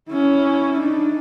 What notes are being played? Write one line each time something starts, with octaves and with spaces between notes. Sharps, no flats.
C#4 E4
D4 D#4